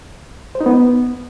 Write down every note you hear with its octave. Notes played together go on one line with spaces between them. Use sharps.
C5
D#4
B3